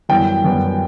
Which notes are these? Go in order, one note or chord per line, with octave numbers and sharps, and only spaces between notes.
F#2 E3 G3 B3 G5
F#2 E3 G3 B3